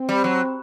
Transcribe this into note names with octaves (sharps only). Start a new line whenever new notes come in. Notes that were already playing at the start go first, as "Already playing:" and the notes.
Already playing: C4
G3
F#3